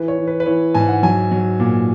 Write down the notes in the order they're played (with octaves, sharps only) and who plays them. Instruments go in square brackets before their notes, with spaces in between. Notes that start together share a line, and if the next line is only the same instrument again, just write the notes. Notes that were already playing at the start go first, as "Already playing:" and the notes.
Already playing: [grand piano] E3 B4
C#5
E3
B4
B4
E3 C#5
G#2 G#5
F#5
F#3 G#5
F#3
A#2